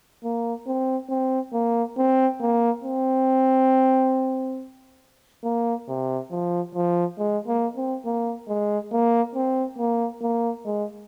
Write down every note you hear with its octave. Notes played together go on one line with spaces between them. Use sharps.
A#3
C4
C4
A#3
C4
A#3
C4
A#3
C3
F3
F3
G#3
A#3
C4
A#3
G#3
A#3
C4
A#3
A#3
G#3